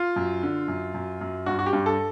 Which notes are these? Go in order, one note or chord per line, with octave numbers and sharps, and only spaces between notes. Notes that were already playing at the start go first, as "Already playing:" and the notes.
Already playing: F4
F#2
D3
F#2
F#2
F#2
G2 F#4
F#4
G4
G2
A4